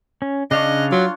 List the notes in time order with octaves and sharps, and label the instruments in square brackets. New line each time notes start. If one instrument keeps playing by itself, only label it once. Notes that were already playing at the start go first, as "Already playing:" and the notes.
[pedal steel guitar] C#4
[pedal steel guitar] C#3 F5 F#6 [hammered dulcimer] D4 C#5 [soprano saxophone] D#5
[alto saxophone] F#3 [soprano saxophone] F4